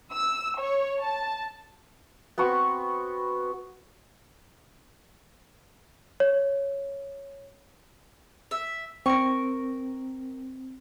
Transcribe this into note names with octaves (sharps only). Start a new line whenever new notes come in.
E6
C#5
A5
B3 C4 F#4 C#6
C#5
E5
C4 A#4 C#6